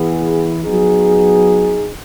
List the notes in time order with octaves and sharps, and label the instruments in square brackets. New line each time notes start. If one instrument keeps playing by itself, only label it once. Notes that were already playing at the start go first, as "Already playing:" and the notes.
Already playing: [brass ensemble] E3 B3 E4 G#4
F#3 B3 D#4 G#4